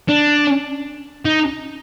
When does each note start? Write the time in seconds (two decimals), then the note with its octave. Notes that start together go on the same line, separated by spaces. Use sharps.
0.09 D4
1.25 D#4